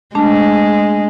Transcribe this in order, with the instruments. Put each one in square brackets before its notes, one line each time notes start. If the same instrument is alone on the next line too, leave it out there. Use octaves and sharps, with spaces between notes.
[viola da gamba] G#3 [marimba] A3 D4 A5